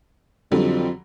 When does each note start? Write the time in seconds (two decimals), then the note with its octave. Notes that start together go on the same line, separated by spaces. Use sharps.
0.52 F2 D3 F#3 G3